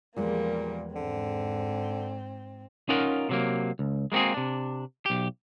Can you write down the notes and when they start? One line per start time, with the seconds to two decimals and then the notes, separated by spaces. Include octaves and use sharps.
0.16 E2 A#2 F3 G3 G#3 A#3
0.95 G#2 D3 C4
2.89 C#4 D#4 F4 A#4 F#5
3.29 C3 F#3 A#3
3.79 C#2
4.12 G#3 A#3 C4 F#4 G#4
4.34 C3 D4
5.06 B1 G4